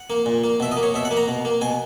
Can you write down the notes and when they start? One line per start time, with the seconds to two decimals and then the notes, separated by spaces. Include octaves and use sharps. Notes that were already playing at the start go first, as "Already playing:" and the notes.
Already playing: F#5
0.10 A#3
0.26 A#2
0.44 A#3
0.60 B2 E5
0.72 D#5
0.77 A#3
0.83 C#5
0.94 B2 E5
1.05 F#5
1.11 A#3
1.17 A#5
1.28 B2
1.45 A#3
1.61 B2 G#5